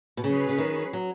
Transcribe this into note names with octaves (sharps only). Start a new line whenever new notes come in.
B2
C#3 F#3 C#4 G#4 B4
C#3
D#3
F#3